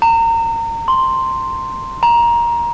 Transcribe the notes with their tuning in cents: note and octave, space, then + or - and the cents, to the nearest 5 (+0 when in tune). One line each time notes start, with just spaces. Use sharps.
A#5 -30
C6 +5
A#5 +15